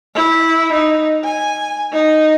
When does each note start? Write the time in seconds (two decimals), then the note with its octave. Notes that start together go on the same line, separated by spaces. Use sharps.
0.15 E4
0.72 D#4
1.24 G#5
1.92 D#4